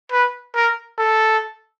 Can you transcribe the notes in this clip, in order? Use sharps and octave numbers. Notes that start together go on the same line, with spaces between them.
B4
A#4
A4